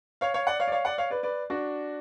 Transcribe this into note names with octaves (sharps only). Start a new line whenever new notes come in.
C#5 F5
C#5 F5
D5 F#5
C#5 F5
D5
C#5 F5
D5 F#5
C#5 F5
B4 D5
B4 D5
D4 F#4